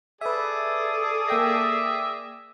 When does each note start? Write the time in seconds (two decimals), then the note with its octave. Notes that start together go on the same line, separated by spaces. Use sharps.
0.21 G#4 A4 B4 D5 E5
1.28 A#3 E5 G5 A#6